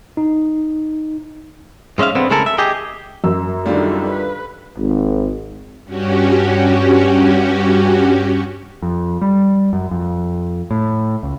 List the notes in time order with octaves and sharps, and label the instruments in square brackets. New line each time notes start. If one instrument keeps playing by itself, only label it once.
[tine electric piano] D#4
[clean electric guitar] G#2 G#3 C#4 E5 F5
B1 D3 B3 C4
C#3 G#3 A3 E4 A4 A#4
E5
G4 G#4 D#5
[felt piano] F#2 [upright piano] E6
[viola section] D3 D#3 F#4 [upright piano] G3 F4
[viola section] B4
[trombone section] G#1
[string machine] G2 C#4 F#4 G4
[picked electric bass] F2
G3
F#2
F2
A2
C#2